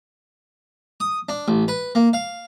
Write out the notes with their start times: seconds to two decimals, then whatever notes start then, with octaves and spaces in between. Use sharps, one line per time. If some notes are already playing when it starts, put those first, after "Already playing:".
1.00 D#6
1.29 D4
1.48 A1
1.68 B4
1.95 A#3
2.13 F5